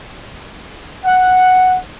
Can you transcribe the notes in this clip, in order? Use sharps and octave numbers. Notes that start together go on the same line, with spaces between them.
F#5